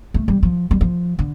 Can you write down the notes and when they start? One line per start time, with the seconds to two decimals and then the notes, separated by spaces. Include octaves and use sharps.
0.14 A3
0.28 G3
0.43 F3
0.71 G3
0.81 F3
1.19 D3